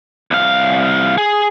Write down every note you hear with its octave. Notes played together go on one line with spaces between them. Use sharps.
C2 F5
G#4